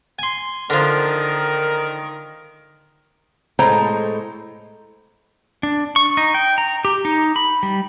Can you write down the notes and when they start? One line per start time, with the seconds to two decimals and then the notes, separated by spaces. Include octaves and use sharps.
0.19 G#5 C6
0.70 D3 D#3 F3 A#4
3.59 A2 G#3 A4 C5 G5 A#5
5.63 D4
5.96 C#6
6.17 D#4
6.34 G5
6.58 A#5
6.85 G4
7.05 D#4
7.36 B5
7.63 G3